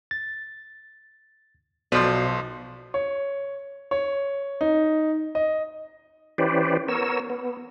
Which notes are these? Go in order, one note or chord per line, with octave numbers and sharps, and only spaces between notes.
A6
B1 B2 F3 A4 B4 C5 D5 C6
C#5
C#5
D#4
D#5
E3 C#4 G4 B4 C5 D5
B3 A#4 C#5 E6
B3